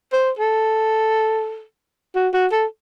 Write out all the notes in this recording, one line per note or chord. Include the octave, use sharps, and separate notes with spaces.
C5
A4
F#4
F#4
A4